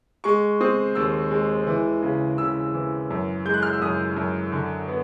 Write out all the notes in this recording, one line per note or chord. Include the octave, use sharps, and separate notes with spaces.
G#3 C#6
C4 D#6
D#2 E6
G#3
E3
C#3
C#3 E6
E3
F#2
G#3 G6
F#6
F6
E6
F#2 D#6
F#2
D3
B3